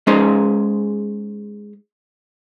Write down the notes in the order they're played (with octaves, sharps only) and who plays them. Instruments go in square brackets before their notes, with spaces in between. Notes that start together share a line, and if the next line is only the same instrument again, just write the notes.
[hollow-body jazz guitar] G#3 C#4 D#4 G#4 C5